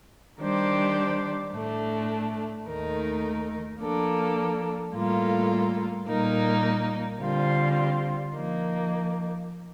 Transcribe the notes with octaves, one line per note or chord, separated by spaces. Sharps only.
D#3 G3 D4 G4 C5
A2 A3 D4
D#2 D#3 A3 D#4 A#4
F3 A#3 D4 A4
A2 G3 A#3 F4 A4
A#2 G3 A#3 D#4 A#4
D3 G3 C4 F4
F3 A#3 D#4